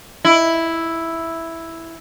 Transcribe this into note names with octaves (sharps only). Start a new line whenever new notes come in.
E4